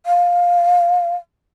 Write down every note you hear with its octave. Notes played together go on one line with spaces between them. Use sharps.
F5